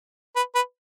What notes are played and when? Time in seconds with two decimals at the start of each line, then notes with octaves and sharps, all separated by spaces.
0.36 B4
0.55 B4